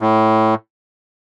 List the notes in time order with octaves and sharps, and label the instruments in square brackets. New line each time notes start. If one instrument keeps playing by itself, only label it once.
[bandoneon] A2